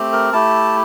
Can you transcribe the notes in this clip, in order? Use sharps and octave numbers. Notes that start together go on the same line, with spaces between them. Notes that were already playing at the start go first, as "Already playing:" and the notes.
Already playing: A3 C4 G4
A#4
A3 E4 G4 A5